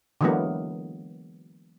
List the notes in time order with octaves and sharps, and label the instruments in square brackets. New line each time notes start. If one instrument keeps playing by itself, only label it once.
[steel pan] D3 E3 F#3 G#3 A#3 B3